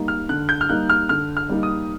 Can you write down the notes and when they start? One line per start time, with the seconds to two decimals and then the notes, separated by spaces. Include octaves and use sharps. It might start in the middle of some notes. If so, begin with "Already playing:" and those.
Already playing: G3 A#3 D#4
0.08 F6
0.29 D3 F#6
0.49 G6
0.61 F6
0.69 G3 A#3 D#4 F#6
0.90 F6
1.09 D3 F6
1.37 F6
1.49 G3 A#3 D#4
1.63 D#6